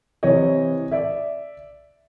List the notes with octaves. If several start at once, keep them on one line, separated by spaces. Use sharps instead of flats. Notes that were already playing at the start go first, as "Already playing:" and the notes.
C3 E3 C#5 D#5
D5 E5